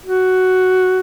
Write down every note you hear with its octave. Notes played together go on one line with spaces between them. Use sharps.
F#4